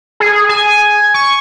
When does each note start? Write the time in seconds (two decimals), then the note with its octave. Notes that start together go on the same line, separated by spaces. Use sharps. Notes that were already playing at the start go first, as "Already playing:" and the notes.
0.20 G#4
0.49 G#5
1.14 C#6